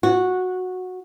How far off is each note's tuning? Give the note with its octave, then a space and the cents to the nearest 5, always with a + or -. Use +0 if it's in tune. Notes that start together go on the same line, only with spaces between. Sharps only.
F#4 -10